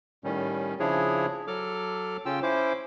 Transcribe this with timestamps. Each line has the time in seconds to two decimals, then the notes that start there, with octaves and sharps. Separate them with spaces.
0.24 A2 D#3 G3 C#4
0.80 C#3 F3 D4 E4 G#4 C#5
1.47 F#3 A4 D6 F6
2.25 C#3 C#4 F4 G5 E6
2.43 C#4 E4 C5 D6